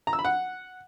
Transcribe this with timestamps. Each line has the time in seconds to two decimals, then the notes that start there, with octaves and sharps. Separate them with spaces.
0.07 A#5
0.13 E6
0.19 B5
0.25 F#5